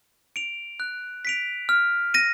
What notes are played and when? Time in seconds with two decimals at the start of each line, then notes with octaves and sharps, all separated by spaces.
0.36 D7 F7
0.80 F#6
1.25 B6 D7 F7
1.69 F6
2.14 A#6 D#7